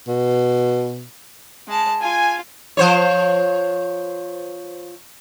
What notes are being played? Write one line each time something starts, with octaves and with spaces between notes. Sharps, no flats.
B2
G#3 A5
F4 G#5
F3 C5 C#5